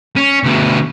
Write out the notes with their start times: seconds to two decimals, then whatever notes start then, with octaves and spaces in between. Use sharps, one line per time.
0.17 C#4
0.44 D2 B2